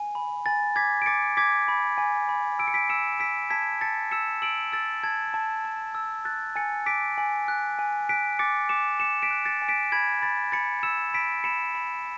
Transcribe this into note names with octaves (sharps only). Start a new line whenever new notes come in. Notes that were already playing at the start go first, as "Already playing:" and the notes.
Already playing: G#5
B5
G#5 A6
D6 G#6 B6
D7
D6 A6 C#7
D6 G#6 B6
B5
G#5
B5
E6 D7
C#7
B6 D7
E6 C#7 E7
E6 B6 D7
A5 G#6 B6
A5 A6 C#7
E6 C#7 E7
E6 D7 F#7
E6 A6
A5 G#6
A5
A5
E6
F#6 A6
G#5 A6 C#7
D6 B6 D7
G#5
F#6
G#5
F#6 B6 D7
D6 A6 C#7
D6 C#7 E7
D6 C#7 E7
B6 D7
F#6
A6 C#7
G#5
B6 D7
B5 G#6 B6
B5 A6
B5 A6 C#7
E6 C#7 E7
B5 B6 D7
B5 C#7 E7
B5